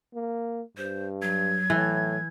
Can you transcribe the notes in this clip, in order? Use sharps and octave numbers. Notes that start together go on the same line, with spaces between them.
A#3
G2 C5
F#3 G#6
A2 E3